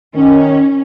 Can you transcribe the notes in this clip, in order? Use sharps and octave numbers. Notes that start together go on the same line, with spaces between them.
D#3 C#4